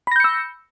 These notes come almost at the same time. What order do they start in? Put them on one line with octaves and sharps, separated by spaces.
B5 A#6 G6 C#7 E6